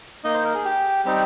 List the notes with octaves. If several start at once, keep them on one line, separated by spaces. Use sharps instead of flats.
A#3 D#4 D#5
C5
A#4
G#4
G4
G3 C4 D#4 G4